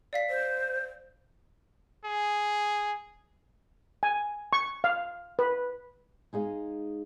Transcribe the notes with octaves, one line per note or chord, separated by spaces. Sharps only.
D5 F5 B6
C5
G#4
G#5
C#6
F5
B4
G#3 D#4 G#4 F5